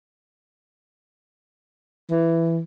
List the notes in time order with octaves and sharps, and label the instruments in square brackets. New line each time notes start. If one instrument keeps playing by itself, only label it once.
[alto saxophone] E3